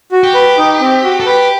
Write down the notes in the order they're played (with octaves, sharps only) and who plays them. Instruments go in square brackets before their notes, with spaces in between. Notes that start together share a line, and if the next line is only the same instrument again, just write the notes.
[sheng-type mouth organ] F#4
[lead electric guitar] G4
[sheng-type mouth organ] B4
D#4
C4
F#4
[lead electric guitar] A4
[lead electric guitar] G4 [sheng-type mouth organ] B4